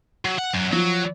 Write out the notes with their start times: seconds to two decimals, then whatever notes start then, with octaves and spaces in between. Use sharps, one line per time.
0.25 F#3
0.38 F#5
0.54 F#2 F#3
0.72 F3 F#3